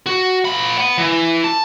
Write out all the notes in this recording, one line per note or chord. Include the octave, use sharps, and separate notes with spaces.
F#4
A#2 B5
F#5 B5
E3
A5